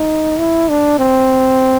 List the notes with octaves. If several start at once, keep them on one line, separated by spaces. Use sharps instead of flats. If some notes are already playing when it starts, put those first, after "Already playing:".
Already playing: D#4
E4
D4
C4